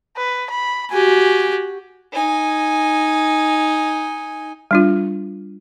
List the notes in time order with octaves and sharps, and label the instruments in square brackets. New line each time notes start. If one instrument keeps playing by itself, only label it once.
[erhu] B4
B5
[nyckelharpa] F#4 G4 [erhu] G#5
[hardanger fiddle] D#4 G#5
[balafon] G3 D4 F4